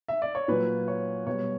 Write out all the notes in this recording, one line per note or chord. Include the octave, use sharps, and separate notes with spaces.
E5
D5
C#5
A#2 F#3 B4
C#5
B2 G3 C#5